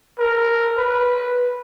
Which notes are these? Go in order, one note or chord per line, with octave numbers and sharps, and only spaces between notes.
A#4
B4